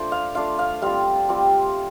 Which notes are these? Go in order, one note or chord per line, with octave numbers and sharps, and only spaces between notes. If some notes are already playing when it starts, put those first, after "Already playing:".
Already playing: A3 D4 F4 C5 D5
F5
A3 D4 F4 F5
F5
G3 C4 F4 F5
G3 C4 F4